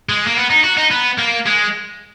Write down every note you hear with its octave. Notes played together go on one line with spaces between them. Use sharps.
G#3
A#3
B3
D#4
F#4
D#4
B3
A#3
G#3